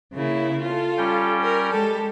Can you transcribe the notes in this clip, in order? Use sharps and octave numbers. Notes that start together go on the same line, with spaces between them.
C#3 A#3 E4
F4 A4
G3 C#4 G5
A#4
G#3 G4 A4